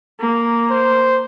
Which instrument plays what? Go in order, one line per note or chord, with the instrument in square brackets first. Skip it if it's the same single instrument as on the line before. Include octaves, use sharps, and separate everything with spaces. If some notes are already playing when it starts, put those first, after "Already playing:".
[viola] A#3
[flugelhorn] C5